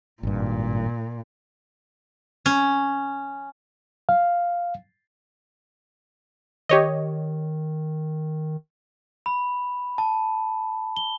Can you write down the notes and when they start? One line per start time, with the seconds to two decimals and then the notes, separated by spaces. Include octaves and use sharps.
0.23 G#1 G2 A#2
2.46 C#4
4.09 F5
6.69 D#3 G4 C#5 D#5
9.26 B5
9.98 A5
10.97 G7